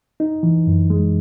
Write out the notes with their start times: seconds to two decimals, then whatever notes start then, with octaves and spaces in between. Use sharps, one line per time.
0.20 D#4
0.43 E3
0.67 F#2
0.90 G#3